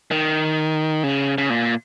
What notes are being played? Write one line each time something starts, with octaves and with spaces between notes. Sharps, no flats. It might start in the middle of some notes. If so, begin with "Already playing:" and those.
D#3
C#3
C#3
A#2